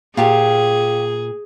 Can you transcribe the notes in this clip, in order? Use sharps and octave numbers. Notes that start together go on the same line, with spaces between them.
A#2 F4 G4 G#4 C#5